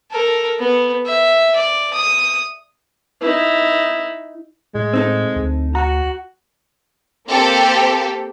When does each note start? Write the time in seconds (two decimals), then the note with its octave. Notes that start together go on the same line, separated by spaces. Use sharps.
0.11 A4 A#4
0.59 B3
1.05 E5
1.55 D5
1.93 D#6
3.21 D#4 E4
4.75 A2 G#3
4.94 C4 D#4 A4
5.36 D2
5.75 F#4 A#5
7.27 A#3 C4 G4 A4